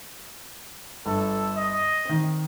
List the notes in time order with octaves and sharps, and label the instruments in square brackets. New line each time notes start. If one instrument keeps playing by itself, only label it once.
[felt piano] G1 [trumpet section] A4
[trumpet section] D#5
[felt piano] D#3 C4